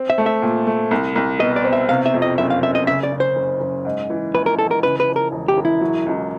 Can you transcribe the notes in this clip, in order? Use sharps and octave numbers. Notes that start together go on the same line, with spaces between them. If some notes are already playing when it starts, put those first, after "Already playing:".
Already playing: C4
E5
A3
E5
A#2
A3
C2
C2
B2 D#5
D5
C4
E5
C3 F5
E5
F2
D#5
F#1 E5
F5
F#1 E5
D#5
C#3 E5
D5
C#3
C5
F#1
F#1
G#2
E3
A#1 B4
A#4
E3 A4
A#4
C#3 B4
B4
F3
A#4
E1
G4
E1
E4
F#3
C#2